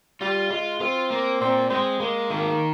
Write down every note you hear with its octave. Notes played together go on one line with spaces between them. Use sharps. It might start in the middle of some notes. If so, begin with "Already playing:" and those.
G3 F4
G#3 F4
C4 F4
A#3
A#2 C4
G#3 C4
G#3 A#3
D#3 A#3